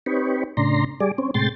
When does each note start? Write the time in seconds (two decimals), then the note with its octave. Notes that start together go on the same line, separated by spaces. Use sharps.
0.06 C4 D#4 G4 B4 C#5
0.57 A2 C#3 D4 A#5 C6
1.00 G3 G#4 D5
1.18 C4 C#4
1.34 A2 C3 G#3 G5 C6 A6